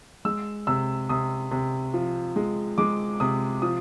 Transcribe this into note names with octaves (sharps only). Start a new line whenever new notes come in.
G#3 E6
C3 E6
C3 D#6
C3
F3
G#3
G#3 D6
C3 D#6
F3 D#6